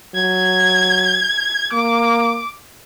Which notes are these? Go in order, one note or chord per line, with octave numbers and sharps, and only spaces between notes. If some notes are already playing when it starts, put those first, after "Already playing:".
F#3 G#6
A#3 D6